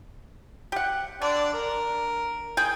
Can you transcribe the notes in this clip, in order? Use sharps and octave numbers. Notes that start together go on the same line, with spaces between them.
G4 F#5
D3 D4 D5
A#4
G#4 G5